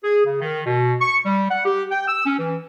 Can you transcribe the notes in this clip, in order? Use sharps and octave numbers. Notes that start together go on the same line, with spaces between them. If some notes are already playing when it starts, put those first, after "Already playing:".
G#4
C#3
D#3
B2
C#6
G3
F#5
G4
G5
E6
C#4
E3